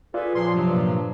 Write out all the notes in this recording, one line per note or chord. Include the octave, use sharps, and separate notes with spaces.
F4 G#4 A4 B4 D5
A#2 F3 C#5 C6
G2 C3 F#3
A#2